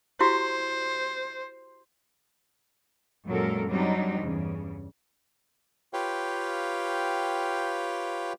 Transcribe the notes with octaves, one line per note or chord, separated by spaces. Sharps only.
E4 F#4 G4 C5
F#2 A#2 F#3 G#3 A4 A#4
F#3 G3 C4 D4 D#4
E2 G2 C#3
F4 G4 B4 C#5 F5 G5